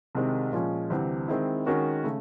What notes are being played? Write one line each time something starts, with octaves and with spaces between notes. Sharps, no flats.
C2 C3 D#3 G#3 C4
A#2 F3 G#3 C#4
D2 C3 E3 G3 C4
D#3 G#3 C4 E4
D#3 G#3 C#4 F#4 A#4
C#3 A3